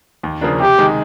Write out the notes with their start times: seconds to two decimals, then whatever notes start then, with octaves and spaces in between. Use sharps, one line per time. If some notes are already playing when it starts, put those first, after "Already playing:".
0.23 D#2
0.41 C#3 F3 A#3 D4
0.60 C3 G4
0.79 D#3 G#3